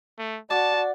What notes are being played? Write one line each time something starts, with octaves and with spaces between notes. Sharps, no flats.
A3
F#4 D5 A5